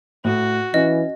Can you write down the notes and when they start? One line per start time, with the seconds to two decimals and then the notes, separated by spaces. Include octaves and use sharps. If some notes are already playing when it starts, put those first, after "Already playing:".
0.25 A2 F#4
0.74 E3 C#4 D#5